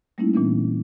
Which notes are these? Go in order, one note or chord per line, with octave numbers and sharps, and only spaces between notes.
G3 A3 A#3 C#4 D#4 E4
A#2 E3 B3 C#4 D4